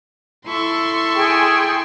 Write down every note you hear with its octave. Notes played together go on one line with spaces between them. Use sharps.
E4 A4 C6 C#6
G#4 G5